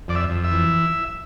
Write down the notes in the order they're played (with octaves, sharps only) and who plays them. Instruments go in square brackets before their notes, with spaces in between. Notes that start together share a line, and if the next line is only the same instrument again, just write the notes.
[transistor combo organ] F2 D5
E5
F2
E5
E3